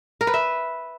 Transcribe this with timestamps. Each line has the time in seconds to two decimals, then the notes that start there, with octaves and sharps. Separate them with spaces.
0.21 A#4
0.27 B4
0.34 E5